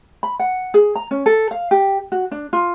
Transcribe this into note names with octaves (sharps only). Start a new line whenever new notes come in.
B5
F#5
G#4
A#5
C#4
A4
F5
G4
F#4
D4
F4